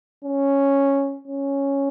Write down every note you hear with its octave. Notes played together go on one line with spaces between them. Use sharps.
C#4
C#4